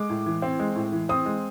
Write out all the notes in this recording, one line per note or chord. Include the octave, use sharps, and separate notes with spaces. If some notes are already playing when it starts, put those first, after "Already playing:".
Already playing: G#3 D6
A2
E3
C4
G#3
A2
E3
C4 D#6
G#3